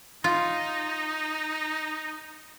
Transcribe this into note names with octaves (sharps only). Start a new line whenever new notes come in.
D#4 F4